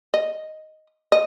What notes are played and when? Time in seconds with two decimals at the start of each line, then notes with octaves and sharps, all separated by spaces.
0.14 D#5
1.12 D#5